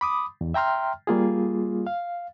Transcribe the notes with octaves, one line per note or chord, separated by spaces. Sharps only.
B5 D6 D#6
E2
E5 G5 A#5 C6 F6
G3 A#3 F4 G#4
F5